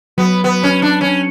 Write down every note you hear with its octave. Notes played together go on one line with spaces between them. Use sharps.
F#3 B3
B3
C#4
D4
C#4